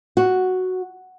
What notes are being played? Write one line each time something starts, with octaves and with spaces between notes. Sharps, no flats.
F#4